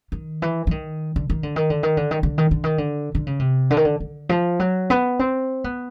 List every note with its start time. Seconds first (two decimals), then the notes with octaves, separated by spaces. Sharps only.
0.12 D#3
0.42 E3
0.67 E3
0.71 D#3
1.16 D3
1.30 D#3
1.43 D3
1.56 D#3
1.70 D3
1.83 D#3
1.97 D3
2.11 D#3
2.23 D3
2.38 D#3
2.51 D3
2.64 D#3
2.78 D3
3.15 D3
3.27 C#3
3.39 C3
3.70 D3
3.77 D#3
3.85 D3
4.00 D3
4.29 F3
4.59 F#3
4.90 B3
5.19 C4
5.64 B3